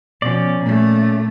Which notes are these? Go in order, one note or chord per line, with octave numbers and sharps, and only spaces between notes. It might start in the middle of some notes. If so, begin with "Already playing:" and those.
B2 F3 C#4 D5
A#2 A3